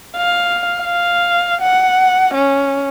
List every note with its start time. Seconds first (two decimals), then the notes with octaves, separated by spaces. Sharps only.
0.17 F5
0.82 F5
1.62 F#5
2.35 C#4